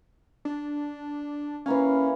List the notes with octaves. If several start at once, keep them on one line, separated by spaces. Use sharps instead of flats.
D4
E3 A#3 C#4 F5